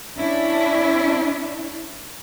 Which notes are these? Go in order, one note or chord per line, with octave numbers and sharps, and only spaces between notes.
C#4 D4 E4